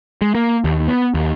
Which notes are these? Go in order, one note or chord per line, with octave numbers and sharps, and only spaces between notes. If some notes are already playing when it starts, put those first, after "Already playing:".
G#3
A#3
D#2
B3
D#2